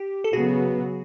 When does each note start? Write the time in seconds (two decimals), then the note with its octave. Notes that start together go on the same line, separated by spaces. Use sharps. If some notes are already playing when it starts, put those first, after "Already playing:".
Already playing: G4
0.24 A4
0.32 C#3 F#3 B3 F#4 G#4